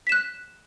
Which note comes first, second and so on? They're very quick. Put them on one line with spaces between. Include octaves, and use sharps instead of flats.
B6 E7 F#6